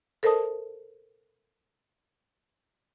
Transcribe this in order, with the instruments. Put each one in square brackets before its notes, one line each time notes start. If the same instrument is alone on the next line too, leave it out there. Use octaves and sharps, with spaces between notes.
[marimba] A4 A#4 C5 D#5 A5 D#6